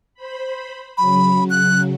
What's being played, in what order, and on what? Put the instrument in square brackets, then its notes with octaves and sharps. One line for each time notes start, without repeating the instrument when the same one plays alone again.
[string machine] C5 B5
[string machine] C#3 F#3 [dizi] B5
[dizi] F#6